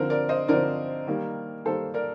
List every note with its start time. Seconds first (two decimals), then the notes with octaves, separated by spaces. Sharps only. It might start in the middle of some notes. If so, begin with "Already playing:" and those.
Already playing: D3 F3 C4 A#4
0.10 A#4 D5
0.29 C5 D#5
0.48 D3 F3 C4 A#4 D5
1.07 D#3 G3 A#3
1.65 D#3 G3 A#3 A4 C5
1.94 A#4 D5